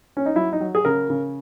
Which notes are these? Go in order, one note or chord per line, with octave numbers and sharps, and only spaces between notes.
C#4
D#4
F#3 E4
D#4
F#3
G#4
C#3 A#4
C#3